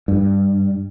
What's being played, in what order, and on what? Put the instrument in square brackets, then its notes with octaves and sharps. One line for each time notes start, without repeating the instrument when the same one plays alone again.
[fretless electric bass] G2